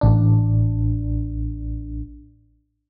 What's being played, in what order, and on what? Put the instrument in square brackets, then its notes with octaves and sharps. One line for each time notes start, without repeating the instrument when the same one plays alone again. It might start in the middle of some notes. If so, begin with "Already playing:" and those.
[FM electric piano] A1 D4